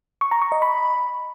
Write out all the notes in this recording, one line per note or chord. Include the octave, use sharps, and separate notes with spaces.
C#6
A#5
C#6
D#5
B5